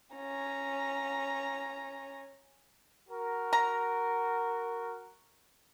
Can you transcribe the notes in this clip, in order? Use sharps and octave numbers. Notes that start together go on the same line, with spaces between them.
C#4 A#5
F#4 A#4
A#5